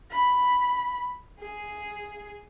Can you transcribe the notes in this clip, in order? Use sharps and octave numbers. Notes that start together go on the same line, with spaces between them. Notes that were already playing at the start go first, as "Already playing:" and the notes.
B5
G#4